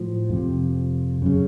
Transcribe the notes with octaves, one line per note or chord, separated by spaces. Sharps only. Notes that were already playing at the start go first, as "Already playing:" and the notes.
Already playing: A2 F3
F2 C3
F#2 C#3